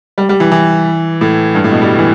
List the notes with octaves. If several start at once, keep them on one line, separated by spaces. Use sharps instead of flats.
G3
G3
E3
E3
A2
G2
A2
B2
G3
E3